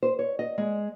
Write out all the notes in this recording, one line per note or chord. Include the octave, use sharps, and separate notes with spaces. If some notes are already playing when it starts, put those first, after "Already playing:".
C5
C#5
D#5
G#3